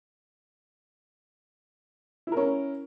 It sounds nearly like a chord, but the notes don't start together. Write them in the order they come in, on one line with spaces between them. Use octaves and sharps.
E4 A#4 C#4